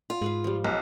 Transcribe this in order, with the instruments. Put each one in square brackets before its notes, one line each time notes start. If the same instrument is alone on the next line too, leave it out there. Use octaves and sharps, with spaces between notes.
[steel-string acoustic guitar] F4
[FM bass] G#2 [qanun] G#4 B4 F5
[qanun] F3 G3
[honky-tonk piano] B1